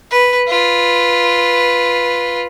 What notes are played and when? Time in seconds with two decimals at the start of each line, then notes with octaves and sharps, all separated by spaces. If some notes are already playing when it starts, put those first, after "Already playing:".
0.11 B4
0.48 F4 B4